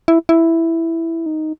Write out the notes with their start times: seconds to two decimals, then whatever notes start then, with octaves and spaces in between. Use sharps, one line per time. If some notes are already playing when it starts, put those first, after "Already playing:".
0.08 E4
0.29 E4
1.26 D#4